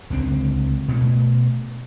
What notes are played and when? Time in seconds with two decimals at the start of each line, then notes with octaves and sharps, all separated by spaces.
0.10 C#2 D3 C4
0.88 B2 A3